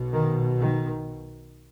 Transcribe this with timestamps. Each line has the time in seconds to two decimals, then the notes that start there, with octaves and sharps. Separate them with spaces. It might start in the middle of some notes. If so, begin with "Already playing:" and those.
Already playing: B1 B2
0.13 D#3
0.59 D#3